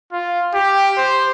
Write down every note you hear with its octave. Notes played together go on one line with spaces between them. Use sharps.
F4
G4
C5